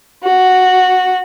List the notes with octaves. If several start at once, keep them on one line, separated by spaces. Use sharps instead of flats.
F#4